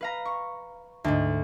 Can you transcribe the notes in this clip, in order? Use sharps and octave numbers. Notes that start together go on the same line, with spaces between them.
B4 F5 A#5
C#6
D2 G#2